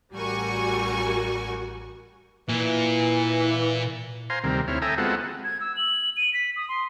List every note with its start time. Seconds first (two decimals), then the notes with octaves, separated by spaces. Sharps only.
0.13 A1 G3 F#4 A#4 G#5 C#6
2.48 A#2 E3
4.30 C5 F5 G#5 A#5 C6
4.44 D2 C3 D#3 G3 C4 A#4
4.68 D2 C4 E4 C#5 F6
4.82 A4 E5 G5 G#5 A#5 D#6
4.98 G#3 B3 C4 F4 F#4 A4
5.44 G#6
5.60 E6
5.76 F#7
6.17 D#7
6.33 B6
6.56 D#6
6.69 C6